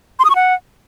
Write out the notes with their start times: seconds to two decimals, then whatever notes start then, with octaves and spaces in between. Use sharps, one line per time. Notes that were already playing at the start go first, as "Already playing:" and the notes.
0.19 C6
0.25 D#6
0.30 C#6
0.35 F#5